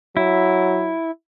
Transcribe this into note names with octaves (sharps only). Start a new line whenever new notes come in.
F#3 E4